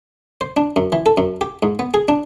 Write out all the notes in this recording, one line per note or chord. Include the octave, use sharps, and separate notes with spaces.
C5
D4
F#2
E3
A4
F#2
G4
G#2
B3
G#4
D4